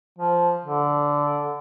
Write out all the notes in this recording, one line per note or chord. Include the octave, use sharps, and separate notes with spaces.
F3
D3